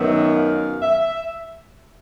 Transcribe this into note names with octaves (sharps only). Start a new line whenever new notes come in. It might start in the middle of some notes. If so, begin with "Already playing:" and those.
Already playing: F#2 D#3 F#3 B3 E5
F5
E5